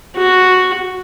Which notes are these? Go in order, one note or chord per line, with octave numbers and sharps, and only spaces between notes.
F#4